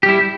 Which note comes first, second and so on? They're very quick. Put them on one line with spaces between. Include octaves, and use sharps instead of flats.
G4 G3 E4